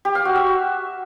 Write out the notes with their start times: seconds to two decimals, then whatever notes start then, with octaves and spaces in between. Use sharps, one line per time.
0.05 G4
0.15 F5
0.25 F#4
0.35 E5